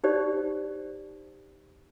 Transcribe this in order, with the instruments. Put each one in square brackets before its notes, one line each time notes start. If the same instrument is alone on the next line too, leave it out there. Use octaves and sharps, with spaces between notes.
[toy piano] D#4 G4 C5 D5